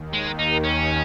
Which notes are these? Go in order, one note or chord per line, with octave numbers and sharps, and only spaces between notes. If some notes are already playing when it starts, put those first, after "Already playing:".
Already playing: D#2 D#3
G#3
D#4
C#4